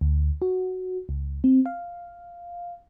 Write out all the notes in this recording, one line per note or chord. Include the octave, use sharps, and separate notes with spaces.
D2
F#4
C#2
C4
F5